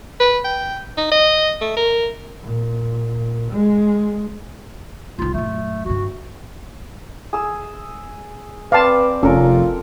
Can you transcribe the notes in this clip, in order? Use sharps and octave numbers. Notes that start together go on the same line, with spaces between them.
B4
G5
D#4
D#5
A3
A#4
A#2
G#3
B1 G3 F4
F#2 A#2 A3
G2 D3 F#4
G#4 E6
C4 B4 D5 F5 A5
F1 C#4 F4 A4 A#4